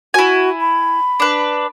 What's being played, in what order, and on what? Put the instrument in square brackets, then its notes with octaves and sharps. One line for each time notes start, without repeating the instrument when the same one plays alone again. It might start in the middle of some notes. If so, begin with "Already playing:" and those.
[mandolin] E4 G#5 [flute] F#4
[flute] B5
[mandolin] D4 B4